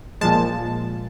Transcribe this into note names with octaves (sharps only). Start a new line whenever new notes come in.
A#2 F3 G#3 A5